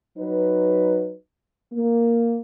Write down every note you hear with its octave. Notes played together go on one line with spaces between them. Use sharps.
F#3 D#4 B4
A#3